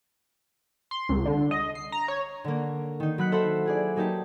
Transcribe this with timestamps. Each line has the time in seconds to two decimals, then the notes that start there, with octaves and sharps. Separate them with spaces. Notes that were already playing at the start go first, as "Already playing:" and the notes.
0.91 C6
1.09 C#2
1.26 D3
1.51 D#5
1.75 C7
1.92 A#5
2.08 C#5
2.44 D3 A#3
3.00 D#3 D#4
3.18 F#3 B5 F#6 C#7
3.32 A4 C5 E5 F#5 B5
3.65 E4 G#4 D5
3.96 F#3 A#3 D#4 G4 A5